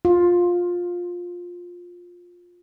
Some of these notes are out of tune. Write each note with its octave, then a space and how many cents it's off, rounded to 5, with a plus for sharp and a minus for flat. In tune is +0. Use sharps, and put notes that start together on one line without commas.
F4 +15